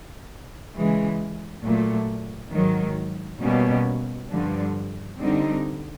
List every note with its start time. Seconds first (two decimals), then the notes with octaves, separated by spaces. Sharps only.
0.75 C#3 E3 G#3
1.63 A#2 F#3 A3
2.52 G#2 D#3 F#3
3.40 B2 G3 A#3 C#4
4.30 G2 D3 F3
5.18 D3 G3 C4 D#4